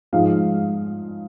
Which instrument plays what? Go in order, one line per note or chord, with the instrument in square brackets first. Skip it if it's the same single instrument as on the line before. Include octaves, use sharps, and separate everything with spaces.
[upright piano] G#2 F3 G#3 F5